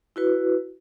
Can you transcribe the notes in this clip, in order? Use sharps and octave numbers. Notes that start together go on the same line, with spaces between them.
E4 F#4 B4